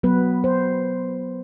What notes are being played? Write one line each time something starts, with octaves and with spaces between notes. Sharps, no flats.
F#3 B3 B4
C5